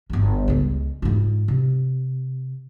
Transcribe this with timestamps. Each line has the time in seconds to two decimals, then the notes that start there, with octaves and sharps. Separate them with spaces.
0.10 G1 D#3
0.48 C#2 C#3
1.02 G#2 F4
1.48 C3